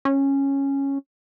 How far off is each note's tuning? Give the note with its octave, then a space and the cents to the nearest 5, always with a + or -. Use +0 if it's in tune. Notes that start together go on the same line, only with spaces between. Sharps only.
C#4 -10